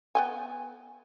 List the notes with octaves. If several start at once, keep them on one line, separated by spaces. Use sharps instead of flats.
B3 G5 G#5